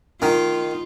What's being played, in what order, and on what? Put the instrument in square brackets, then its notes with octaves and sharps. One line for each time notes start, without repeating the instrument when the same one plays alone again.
[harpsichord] D#3 [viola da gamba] F4